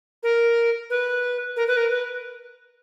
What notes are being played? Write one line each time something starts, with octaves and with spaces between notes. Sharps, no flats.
A#4
B4
A#4
B4
A#4
B4